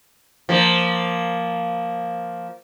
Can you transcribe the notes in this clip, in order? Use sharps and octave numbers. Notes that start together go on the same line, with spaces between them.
F3 A#3